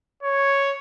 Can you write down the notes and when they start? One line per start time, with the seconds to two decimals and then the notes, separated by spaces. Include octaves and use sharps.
0.23 C#5